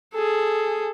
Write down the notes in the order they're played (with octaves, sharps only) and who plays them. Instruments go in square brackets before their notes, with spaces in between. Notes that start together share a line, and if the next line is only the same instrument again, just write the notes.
[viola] G#4 A4